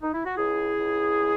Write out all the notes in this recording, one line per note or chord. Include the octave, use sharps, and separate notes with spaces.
D#4
E4
F#4
C#2 E4 G#4
C#2
G#3